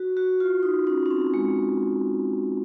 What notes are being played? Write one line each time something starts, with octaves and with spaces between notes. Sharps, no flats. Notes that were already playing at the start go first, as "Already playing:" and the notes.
Already playing: F#4
F#4
F4
D#4
C#4
C#4
C4
G#3